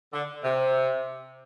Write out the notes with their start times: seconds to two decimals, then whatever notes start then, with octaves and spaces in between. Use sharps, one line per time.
0.13 D3
0.43 C3